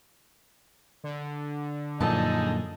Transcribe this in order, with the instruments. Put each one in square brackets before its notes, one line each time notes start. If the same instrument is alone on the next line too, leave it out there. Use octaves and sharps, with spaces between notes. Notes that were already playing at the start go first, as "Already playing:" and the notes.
[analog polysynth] D3
[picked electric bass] F#2 A#2 F3 [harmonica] D#4 G#4 A4 [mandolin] D#5 A5